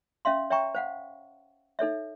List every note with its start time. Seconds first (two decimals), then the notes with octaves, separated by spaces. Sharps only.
0.25 C#4 E5 F5 C6
0.50 C#5 E5 G5 A#5 C#6
0.75 C5 F5 F#5
1.79 D#4 A4 C#5 E5